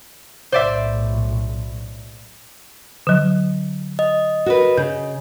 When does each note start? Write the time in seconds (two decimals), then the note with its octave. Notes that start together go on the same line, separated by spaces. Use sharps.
0.52 B1 A2 C5 D5 E5
3.07 D3 F#3
3.99 D#5
4.46 F#4 A#4 B4
4.77 C#3 G6